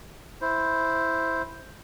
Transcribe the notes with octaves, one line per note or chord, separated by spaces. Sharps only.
E4 C5